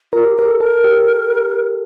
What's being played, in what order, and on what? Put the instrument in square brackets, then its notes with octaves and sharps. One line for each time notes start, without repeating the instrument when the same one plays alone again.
[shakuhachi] F4 [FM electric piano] A#4
[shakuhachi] G4
[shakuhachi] G4 [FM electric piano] A#4
[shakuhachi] A4
[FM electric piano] A4 [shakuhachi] A#4
[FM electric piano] G4